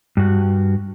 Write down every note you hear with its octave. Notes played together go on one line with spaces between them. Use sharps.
G2 F#4